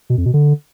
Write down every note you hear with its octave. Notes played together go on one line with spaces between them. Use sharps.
B2
F2
B2
D3